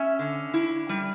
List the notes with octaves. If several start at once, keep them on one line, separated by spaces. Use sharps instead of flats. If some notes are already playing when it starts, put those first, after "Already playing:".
Already playing: C#4 E5
D3
E4
G3